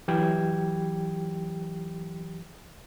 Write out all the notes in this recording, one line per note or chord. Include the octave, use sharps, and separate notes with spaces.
E3 F#3 G4 G5 G#6